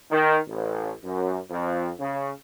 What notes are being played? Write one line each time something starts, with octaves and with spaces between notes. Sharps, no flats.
D#3
A1
F#2
F2
C#3